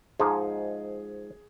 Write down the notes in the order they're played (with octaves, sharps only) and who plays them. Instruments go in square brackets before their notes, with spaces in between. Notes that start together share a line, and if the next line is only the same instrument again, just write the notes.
[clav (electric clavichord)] G#2 F3 G#3 D#4 [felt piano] G#4